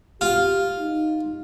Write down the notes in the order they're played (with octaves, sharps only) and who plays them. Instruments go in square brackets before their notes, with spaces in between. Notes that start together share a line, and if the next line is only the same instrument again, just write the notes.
[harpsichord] F4 [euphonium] G4
[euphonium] D#4